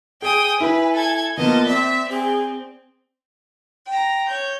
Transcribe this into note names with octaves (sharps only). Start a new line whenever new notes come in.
G#4 G5 G#5 D#6
E4 B4
A4 G#6
F3 A#3 B3 F4 D#5 A5
C4 D5 E5
C4 G#4
G5 A#5
C#5 G6